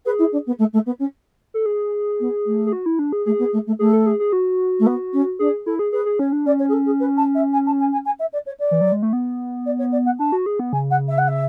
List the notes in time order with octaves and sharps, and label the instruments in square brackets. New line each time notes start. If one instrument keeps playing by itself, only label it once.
[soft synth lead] G#4 [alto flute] B4
[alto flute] E4
D4
B3
A3
A3
B3
C#4
[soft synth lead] A4
G#4
[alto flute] B3
A3
[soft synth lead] G#4
F#4
E4
D4
G#4
[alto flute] A3 [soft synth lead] G#4
[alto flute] B3
A3
A3
[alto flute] A3 [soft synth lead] G#4
[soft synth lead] A4
G#4
G#4
F#4
[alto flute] A3
B3
C#4
[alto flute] D4 [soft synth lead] G#4
[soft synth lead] E4 [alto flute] A4
[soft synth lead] G#4
[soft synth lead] G#4 [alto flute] B4
[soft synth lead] G#4
[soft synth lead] C#4 [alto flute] C#5
[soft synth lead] D4
[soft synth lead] C#4 [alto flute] D5
[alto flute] C#5
G#4
A4
G#4
B4
A5
E5
G#5
A5
G#5
G#5
G#5
E5
D5
C#5
D5
[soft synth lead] E3
F#3
G#3
A3
B3
[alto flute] D5
C#5
D5
F#5
[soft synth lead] D4 [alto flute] A5
[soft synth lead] F#4
G#4
B3
[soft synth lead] C#3 [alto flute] G#5
[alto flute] F#5
E5
F#5
E5